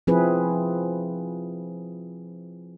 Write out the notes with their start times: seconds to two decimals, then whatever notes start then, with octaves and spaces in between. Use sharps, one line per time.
0.07 F3 C4 E4 G#4 B4